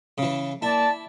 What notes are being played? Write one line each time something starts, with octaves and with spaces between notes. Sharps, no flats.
C#3 E3
A#3 E4 D5 A5